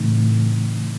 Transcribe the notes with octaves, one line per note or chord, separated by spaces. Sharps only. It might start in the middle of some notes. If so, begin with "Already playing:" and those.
Already playing: A2 C#3 E3 A3 C4 D#4